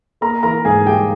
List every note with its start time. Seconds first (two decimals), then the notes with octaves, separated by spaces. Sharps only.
0.21 A#3 A#4 A#5
0.43 E3 A#4 A#5
0.65 G#2 G#4 G#5
0.86 G3 G4 G5